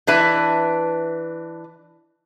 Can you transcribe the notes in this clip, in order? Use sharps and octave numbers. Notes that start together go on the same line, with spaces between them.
E3 D4 B4 E5